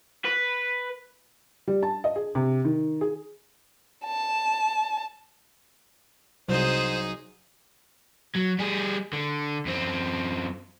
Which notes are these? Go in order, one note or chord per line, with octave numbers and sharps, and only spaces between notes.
B4
G3
A5
D#5
G#4
C3
D#3
G#4
A5
C2 F#3 D#4 G#4 C5
F#3
G3 G#4
D3
F#2 C4